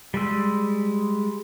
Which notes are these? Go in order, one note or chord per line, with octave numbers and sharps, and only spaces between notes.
G3 G#3 E6